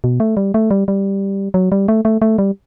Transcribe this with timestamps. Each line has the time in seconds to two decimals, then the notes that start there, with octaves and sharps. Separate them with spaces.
0.04 B2
0.20 A3
0.37 G3
0.54 A3
0.71 G3
0.88 G3
1.54 F#3
1.72 G3
1.88 A3
2.05 A3
2.22 A3
2.38 G3